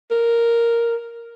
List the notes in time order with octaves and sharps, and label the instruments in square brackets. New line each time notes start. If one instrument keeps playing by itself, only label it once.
[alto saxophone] A#4